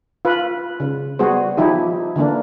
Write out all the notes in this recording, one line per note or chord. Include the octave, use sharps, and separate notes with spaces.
F4 B4
C#3
G3 B3 F#4 G#4 C5
F3 D#4 E4 G4
D3 E3 A#3 D4